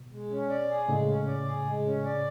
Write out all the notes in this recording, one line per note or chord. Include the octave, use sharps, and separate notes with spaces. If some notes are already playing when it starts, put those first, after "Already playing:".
Already playing: B2
G#3
C#4
D5
G#4
A2 C#3 G#3
C#4
D5
G#4
G#3
C#4
D5